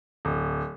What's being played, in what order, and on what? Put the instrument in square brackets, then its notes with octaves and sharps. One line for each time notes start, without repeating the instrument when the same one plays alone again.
[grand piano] D1